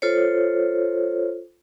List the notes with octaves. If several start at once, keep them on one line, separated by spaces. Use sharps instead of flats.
F4 A4 C5 C#5